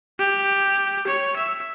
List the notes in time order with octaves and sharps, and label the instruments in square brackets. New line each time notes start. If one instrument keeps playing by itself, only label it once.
[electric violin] G4
C#5
E5